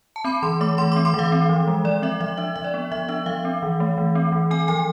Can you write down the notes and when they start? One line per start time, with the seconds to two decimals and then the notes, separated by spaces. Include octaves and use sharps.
0.16 A5
0.25 C4 B5
0.43 E3 C6
0.61 A3 D6
0.78 E3 C6
0.92 D6
0.96 C4
1.05 C6
1.14 E3 F5
1.32 C4
1.49 F3
1.68 G#3
1.84 F3 D5
2.02 C4 E5
2.20 F3 E5
2.37 D4 E5
2.56 F3 E5
2.64 D5
2.74 B3
2.92 F3 E5
3.09 D4 E5
3.26 F3 F5
3.45 C4
3.63 E3
3.80 A3
3.98 E3
4.15 C4
4.32 E3
4.51 C4 G#5
4.68 F3 G#5